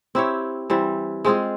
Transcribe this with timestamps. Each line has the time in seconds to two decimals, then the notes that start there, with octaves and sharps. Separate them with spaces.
0.15 C4 E4 G4 C#5
0.70 E3 G3 C4
1.25 G#3 C4 F4 G#4